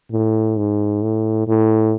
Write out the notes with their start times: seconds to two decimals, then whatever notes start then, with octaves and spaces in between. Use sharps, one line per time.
0.12 A2
0.57 G#2
1.02 A2
1.47 A2